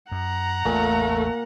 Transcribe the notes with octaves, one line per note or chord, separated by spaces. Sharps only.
F#2 F#5 A#5
A1 E2 A#2 A3